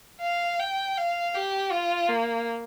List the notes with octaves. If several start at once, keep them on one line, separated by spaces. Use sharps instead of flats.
F5
G5
F5
G4
F4
A#3